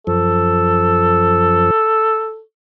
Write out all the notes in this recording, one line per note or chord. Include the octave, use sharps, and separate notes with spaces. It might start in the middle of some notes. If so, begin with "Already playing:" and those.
F#2 F3 A4